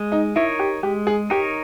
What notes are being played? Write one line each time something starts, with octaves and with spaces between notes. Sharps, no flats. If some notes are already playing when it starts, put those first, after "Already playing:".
Already playing: G#3
D#4
D#4 E4 A#4 C#5
G4
G#3 G4
G#4
D#4 G4 A#4 C#5